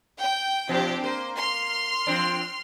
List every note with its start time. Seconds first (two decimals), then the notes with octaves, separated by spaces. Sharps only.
0.19 G5
0.69 B2 F3 C4 D4 G4
1.04 A#3 C5
1.36 C6 F6
2.07 F3 C4 D4